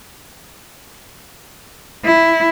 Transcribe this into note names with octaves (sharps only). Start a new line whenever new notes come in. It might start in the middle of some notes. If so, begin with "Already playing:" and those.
E4